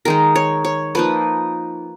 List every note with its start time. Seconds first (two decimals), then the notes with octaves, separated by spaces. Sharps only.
0.05 D#3 G#3 D#4 A#4
0.36 C#5
0.65 C#5
0.95 F3 A#3 D#4 B4